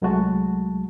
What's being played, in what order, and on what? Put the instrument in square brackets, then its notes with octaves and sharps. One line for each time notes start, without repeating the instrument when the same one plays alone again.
[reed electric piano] C2 F#3 G#3 A3 F#4 A5